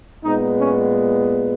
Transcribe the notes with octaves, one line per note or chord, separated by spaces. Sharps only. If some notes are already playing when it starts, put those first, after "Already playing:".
A#2 G#3 B3 D#4
C#4